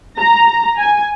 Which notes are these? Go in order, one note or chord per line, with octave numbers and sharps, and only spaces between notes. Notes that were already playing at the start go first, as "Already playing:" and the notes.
A#5
G#5